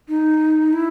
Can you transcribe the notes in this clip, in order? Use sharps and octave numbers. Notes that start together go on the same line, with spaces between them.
D#4
E4